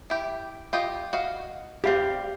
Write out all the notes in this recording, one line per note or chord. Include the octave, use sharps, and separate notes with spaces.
E4 G4
F4 G4 D#5
F#4 D#5 F5
G3 C4 G4 F5